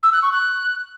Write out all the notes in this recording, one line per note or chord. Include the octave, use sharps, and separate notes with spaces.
E6
F#6
C#6
F#6